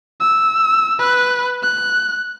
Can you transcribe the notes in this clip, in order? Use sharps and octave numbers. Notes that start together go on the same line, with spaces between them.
E6
B4 F#6
F#6